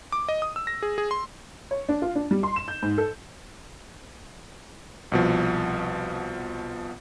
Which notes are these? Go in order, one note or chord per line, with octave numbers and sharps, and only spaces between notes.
D6
D#5
D#6
E6
A#6
G#4
G#4
C6
C#5
D4
F4
D4
G3
C6
E7
G6
G#2
A4
C2 B2 F3